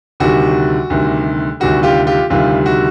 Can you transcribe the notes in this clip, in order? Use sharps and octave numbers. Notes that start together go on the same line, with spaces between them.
D2 C3 D#3 G3 F#4
D2 C3 D#3 G3
D2 C3 D#3 G3 F#4
F4 G4
F4 G4
D2 C3 D#3 G3 F4
F#4